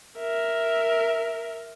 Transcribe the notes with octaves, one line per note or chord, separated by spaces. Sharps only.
A#4 E5